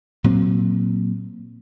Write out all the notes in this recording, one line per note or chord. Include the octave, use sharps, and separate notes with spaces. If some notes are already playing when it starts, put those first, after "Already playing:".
A#2 F#3 C4